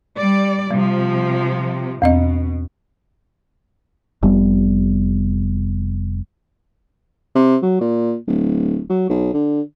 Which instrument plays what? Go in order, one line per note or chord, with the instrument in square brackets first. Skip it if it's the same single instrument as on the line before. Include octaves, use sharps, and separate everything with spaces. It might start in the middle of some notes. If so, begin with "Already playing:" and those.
[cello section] G3 D5
[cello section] C3 F3 [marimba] G3
[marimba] E2 C4 D#5 [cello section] B2
[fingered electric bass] F1 G3 B3
[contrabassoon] C3
F#3
A#2
D1
F#3
B1
D3